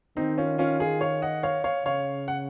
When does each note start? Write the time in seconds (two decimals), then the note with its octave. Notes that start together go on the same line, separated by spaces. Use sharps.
0.17 D#3 C4 D#4
0.38 C#4 F4
0.58 C#4 F4
0.80 F4 G#4
1.01 C#5 F5
1.22 D#5 F#5
1.43 C#5 F5
1.64 C#5 F5
1.85 C#3 C#5 F5
2.28 F#5